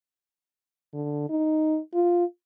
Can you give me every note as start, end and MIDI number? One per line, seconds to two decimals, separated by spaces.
0.94 1.28 50
1.30 1.78 63
1.94 2.25 65